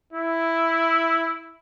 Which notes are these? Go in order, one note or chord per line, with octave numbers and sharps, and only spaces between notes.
E4